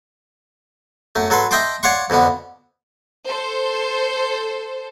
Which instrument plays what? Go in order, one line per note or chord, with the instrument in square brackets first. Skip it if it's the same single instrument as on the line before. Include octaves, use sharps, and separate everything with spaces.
[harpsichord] F#2 A3
F#3 A4 B4 C6
D#5 E5 G5 A5 C6 D6
C#5 D5 F5 F#5 C6 C#6
F2 B2 D3 B3
[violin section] A4 C5